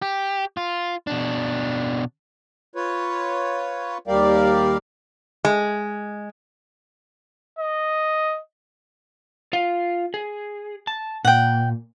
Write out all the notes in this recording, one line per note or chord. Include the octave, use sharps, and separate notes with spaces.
G4
F4
B2 D4
F4 B4 C#5
D#2 G3 G4 A#4 D5 F5
G#3
D#5
F4 F5
G#4
A5
A#2 F#5 G5